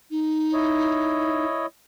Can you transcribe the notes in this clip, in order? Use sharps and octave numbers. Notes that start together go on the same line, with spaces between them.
D#4
E4 C#5 D#5